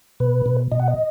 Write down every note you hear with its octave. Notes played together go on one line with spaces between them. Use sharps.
B2 B4
B2
B2 D#5
F#5
D#5